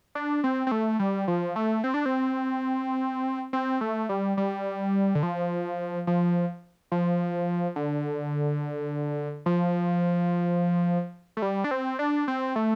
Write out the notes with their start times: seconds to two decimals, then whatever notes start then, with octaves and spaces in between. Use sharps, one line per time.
0.15 D4
0.44 C4
0.67 C4
0.72 A3
0.99 G3
1.28 F3
1.56 A3
1.84 C4
1.94 D4
2.06 C4
3.53 C4
3.81 A3
4.09 G3
4.37 G3
5.15 D3
5.23 F3
6.07 F3
6.92 F3
7.76 D3
9.46 F3
11.37 A3
11.42 G3
11.64 D4
11.71 C4
11.99 D4
12.28 C4
12.56 A3